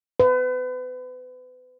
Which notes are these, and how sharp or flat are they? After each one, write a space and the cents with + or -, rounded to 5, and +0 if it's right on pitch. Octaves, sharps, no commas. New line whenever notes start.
B4 +35